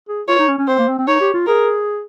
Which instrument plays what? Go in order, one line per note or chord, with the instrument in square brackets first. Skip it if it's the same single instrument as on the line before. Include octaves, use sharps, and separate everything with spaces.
[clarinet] G#4
[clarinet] F4 [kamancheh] C#5
[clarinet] D#4
C#4
C#4
[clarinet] C4 [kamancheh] C5
[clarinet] A#3
C4
C4
[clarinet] D#4 [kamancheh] C#5
[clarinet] G4
F4
[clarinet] G#4 [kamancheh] A#4